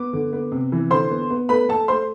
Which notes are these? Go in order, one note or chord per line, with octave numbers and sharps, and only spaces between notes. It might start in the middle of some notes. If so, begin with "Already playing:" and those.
Already playing: B3 D6
D3
B3
C3
E3
D3 C5 C6
B3
B3
A3 B4 B5
A3 A4 A5
A3 C5 C6